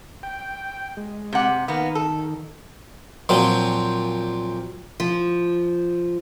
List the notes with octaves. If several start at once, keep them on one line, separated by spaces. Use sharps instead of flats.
G5
G#3
C3 F#5
D#3 A#3 B3
A4
A#2 F3 F#3 C4
F3